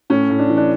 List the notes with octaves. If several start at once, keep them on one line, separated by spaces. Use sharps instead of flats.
A2 C#4
A2
D4
E3
D4